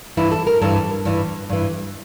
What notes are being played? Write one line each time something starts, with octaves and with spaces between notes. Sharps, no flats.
G2 E3 E4
A4
A#4
G2 E3 A4
G2 E3
G2 E3